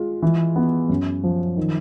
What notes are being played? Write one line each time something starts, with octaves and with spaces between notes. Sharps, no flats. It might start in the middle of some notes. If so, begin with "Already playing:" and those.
Already playing: G#3 F4
E3
B3
F#2
F3
D#3